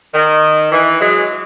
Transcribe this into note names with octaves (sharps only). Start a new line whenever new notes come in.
D#3
E3
F#3 G#3